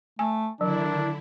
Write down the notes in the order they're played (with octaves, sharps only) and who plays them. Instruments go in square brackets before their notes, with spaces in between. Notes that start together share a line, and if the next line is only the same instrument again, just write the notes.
[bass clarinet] A3 [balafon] G#5
[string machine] D3 E4 [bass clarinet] D#3 [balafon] F#3 [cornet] D4